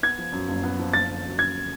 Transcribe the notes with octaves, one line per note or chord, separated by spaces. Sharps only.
B3 G#6
F3
F#2
F#1
B3
F3
F#1 A6
D3
F#2
F#1 G#6